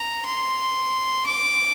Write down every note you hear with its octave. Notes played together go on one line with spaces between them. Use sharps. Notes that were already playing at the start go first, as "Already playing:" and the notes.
Already playing: A#5
C6
D6